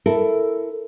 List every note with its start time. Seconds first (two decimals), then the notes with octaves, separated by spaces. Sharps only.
0.06 E4 A4 A#4